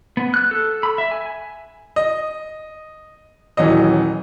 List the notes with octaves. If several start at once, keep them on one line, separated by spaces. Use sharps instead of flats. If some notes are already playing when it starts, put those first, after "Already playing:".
B3
F#6
A4
B5
E5
G#5
D#5
D#1 E3 F#3 D#5